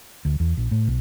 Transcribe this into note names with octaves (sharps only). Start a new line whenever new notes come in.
D2
E2
A#1
A2
B1